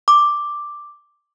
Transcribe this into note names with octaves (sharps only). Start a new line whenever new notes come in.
D6